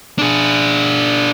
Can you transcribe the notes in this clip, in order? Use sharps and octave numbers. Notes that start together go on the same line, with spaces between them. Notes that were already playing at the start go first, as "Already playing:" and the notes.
D4 G#4